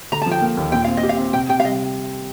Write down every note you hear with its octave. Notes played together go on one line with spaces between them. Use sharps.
D3 A#5
A5
F3
G5
A#3
D#2
A#2 G5
C4 F5
D#5
G4
F5
C4
C3 G5
C3 G5
F5
G3 D#5